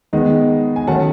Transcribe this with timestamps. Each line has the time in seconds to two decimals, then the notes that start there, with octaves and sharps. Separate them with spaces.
0.13 D#3 G#3 B3 D#4
0.76 G#5
0.87 D#3 F#3 A3 C#4 F#5 A5